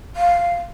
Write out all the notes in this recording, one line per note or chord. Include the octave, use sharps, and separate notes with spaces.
F5